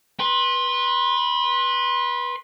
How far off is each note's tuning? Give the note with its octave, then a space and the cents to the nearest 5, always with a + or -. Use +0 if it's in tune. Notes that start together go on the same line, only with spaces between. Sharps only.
B4 -15 C6 +20